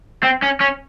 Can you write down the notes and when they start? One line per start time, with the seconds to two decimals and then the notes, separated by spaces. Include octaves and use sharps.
0.24 C4
0.43 C#4
0.61 C#4